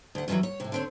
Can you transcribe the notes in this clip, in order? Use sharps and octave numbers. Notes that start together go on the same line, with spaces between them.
D2 F#5
G2 C3 D#3 E3 F#3
C#5
A2 C3
D3 C4 C#5